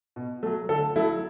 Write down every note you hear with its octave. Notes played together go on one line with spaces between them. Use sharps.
B2
F#3 A3
D3 A4
F#3 A3 E4